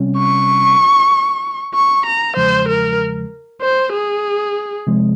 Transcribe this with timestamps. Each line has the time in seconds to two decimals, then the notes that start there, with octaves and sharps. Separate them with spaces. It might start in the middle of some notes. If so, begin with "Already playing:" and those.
Already playing: C3 G3 C#4
0.18 C#6
1.74 C#6
2.06 A#5
2.37 E2 C#3 F3 G#3 C5
2.69 A#4
3.62 C5
3.93 G#4
4.87 C3 F3 G#3